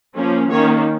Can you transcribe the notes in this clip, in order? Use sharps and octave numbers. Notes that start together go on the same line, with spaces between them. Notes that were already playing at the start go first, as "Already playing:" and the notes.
F3 A#3 C#4
D#3 A#3 C#4 C#5